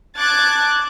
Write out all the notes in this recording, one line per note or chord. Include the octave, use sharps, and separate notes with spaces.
A5 D6 F#6 G#6 A6